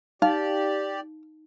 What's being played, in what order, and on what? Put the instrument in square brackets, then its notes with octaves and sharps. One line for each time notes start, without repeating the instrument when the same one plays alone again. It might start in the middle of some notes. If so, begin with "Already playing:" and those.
[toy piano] D#4 [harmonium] G4 D5 [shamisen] F5